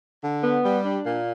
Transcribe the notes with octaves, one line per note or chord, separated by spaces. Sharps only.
D3
B3
G3
D4
A#2